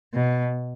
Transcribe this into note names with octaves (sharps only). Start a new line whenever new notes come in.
B2